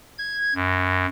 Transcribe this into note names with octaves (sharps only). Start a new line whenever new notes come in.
G#6
F#2